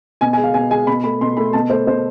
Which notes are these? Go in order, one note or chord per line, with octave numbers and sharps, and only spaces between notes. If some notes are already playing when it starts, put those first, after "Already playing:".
B2 G#5
G#5
G#3
F5
B2 G#5
G#3 G#5
B2 B5
A3 B5
B2 C6
A3 B5
B2 A5
A3 C5
B2 C5